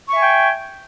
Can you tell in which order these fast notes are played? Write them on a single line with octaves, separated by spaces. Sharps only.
C#6 E5 G#5 G5